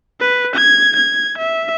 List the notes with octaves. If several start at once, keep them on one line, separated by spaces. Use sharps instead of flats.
B4
G#6
G#6
E5